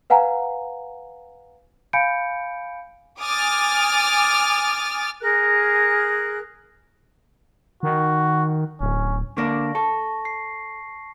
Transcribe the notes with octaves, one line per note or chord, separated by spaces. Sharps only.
B4 F5 F#5 G#5 A#5
F5 G#5 B5 G6 C#7 D7
G#5 D6 D#6 F6 A6
G#4 A#4 F#6
D#3 F#4
D1 C#4
D3 A#3 D4 C#6 A#6
A4 A5 C#6
C7